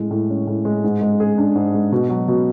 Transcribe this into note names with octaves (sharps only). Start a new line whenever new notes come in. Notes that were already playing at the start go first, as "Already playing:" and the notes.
Already playing: A2 G#3
A2
C#4
A2
G#3
G#2
G#3
G#4
D4
G#2
G#3
B2
F#3
B2